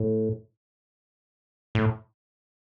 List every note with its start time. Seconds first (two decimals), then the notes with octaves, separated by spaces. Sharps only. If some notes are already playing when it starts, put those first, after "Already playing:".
Already playing: A2
1.75 A2